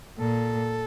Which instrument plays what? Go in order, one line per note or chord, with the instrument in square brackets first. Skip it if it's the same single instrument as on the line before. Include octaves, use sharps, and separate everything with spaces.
[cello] A#2 [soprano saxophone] A4